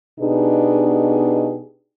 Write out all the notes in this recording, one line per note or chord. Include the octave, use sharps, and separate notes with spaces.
B2 B3 D4 D#4 G4 G#4